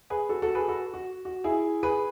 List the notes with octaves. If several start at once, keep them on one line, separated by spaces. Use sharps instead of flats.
G#4 B4
F#4 A4
F#4 A4
G#4 B4
F#4 A4
F#4
F#4
E4 G#4
G#4 B4